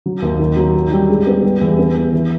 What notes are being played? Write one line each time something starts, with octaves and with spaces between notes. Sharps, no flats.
F#3
D#2
D#3
F#3
D#3
G3
G#3
B3
G3
E2
B3
E4
E3